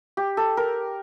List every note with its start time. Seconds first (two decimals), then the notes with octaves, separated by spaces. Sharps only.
0.17 G4
0.37 A4
0.57 A#4